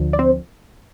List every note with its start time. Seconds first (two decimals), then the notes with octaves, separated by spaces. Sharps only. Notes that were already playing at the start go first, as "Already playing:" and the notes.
Already playing: D2 D3 F3
0.13 D5
0.19 C4 C5